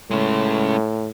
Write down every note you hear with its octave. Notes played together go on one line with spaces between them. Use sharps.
A2 G#3 C#4